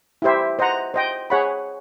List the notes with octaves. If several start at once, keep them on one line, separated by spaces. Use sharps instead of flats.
E4 G4 C5 E5
C5 D#5 F#5 A#5
C5 D#5 G5
G#4 C#5 F#5 B5